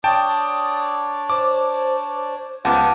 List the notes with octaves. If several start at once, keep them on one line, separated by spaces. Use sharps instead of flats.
D4 C#5 D5 G5 A5 D#6
C5 D6
C#2 B3 F4 G4 F#5 A5 D6